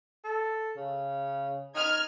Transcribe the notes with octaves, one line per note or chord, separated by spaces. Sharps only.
A4
C#3
D#4 F6 G#6